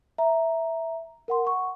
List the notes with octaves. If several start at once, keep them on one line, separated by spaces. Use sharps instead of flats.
E5 A#5
A#4 F#5 C6
F#5 C#6